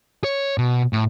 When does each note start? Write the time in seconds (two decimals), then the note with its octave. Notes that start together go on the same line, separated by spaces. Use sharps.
0.24 C#5
0.58 B2
0.93 A2